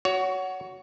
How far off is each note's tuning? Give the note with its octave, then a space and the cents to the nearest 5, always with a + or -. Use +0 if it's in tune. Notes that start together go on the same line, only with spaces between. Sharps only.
F#4 +5 C#5 +25